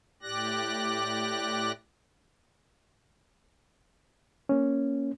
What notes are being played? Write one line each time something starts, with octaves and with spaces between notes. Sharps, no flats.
A2 G4 D5 F#6 A#6
A#3 C#4